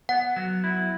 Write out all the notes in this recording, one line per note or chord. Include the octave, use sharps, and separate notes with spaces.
B3 F#5
F#3
E4